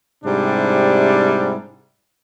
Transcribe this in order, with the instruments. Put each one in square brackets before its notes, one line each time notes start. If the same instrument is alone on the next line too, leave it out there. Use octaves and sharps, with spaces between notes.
[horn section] G#2 C3 G3 D4 E4